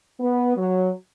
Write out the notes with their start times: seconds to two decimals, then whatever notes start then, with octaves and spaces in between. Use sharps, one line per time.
0.20 B3
0.57 F#3